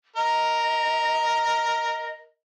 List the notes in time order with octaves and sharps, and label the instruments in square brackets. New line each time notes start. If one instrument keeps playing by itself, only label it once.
[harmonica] A#4 [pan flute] D#5